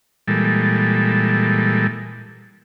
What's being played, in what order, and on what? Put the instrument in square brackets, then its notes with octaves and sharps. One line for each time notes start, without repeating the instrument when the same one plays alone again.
[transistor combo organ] A#2 E3 G3 G#3 A4